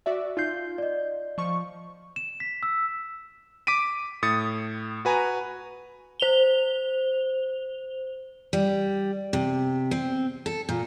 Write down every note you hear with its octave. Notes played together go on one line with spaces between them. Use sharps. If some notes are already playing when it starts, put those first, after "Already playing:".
F#4 D5 E5
D#4 F4 G6 C7
D5 D#5
F3 C#6
E7
B6
E6
D6 B6 D7 D#7
A2 D#6 A6 C#7
F#4 B4 G#5 A#5
C5 F7 G7
G3
C3
C4
A4
A#2